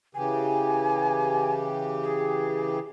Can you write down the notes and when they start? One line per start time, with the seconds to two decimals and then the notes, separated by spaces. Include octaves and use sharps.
0.15 C#3 E3 G4 G#5
2.03 G#4